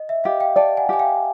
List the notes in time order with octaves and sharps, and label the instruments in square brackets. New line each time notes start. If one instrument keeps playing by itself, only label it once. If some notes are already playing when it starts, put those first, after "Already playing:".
Already playing: [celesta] D#5
E5
[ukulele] G4 [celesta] D#5 F5
[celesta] F5 G5
[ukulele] D5 [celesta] G5 A5
[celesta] F#5 G#5
[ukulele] G4 [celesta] G#5
[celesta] F5 G5